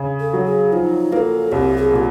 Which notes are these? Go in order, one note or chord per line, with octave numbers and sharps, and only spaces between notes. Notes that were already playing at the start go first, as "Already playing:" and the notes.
Already playing: C#3
A4
F#3
G#4
F3 D#4
A#3 A4 B4
C2 G4
G#4
A#2 G4